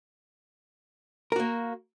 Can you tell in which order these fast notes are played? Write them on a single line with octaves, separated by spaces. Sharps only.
A#4 F#4 A#3